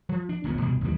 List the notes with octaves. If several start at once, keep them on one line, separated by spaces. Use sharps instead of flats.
F3
D4
D1 A#1 D#2 B3
C2 G2 B2
A1 D#2 E3 G3